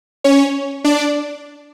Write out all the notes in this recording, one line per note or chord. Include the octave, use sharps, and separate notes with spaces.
C#4 C#5
D4 D5